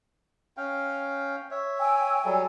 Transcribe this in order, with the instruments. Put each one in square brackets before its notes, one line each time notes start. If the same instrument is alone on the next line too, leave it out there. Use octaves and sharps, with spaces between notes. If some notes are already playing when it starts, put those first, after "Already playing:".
[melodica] C#4 F5 G5
C#5 E5
[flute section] G5 G#5 E6
[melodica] F#3 G3 A4